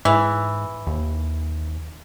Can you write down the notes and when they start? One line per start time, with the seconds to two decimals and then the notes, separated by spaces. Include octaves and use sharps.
0.05 G#2 E3
0.87 D#2